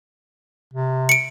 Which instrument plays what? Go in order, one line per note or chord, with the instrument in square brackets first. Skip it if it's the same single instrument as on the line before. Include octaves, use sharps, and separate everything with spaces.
[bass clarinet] C3
[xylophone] C#7 D7